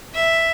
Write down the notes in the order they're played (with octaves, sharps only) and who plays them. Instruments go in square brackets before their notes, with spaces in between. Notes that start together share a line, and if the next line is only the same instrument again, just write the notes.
[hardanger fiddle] E5